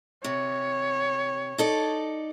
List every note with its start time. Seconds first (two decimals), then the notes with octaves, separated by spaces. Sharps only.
0.24 C3 C#5
1.58 D#4 A4 D5